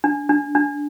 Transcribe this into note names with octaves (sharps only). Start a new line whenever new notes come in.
D4
D4
D4